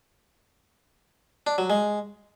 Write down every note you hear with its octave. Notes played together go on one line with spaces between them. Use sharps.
D4
F#3
G#3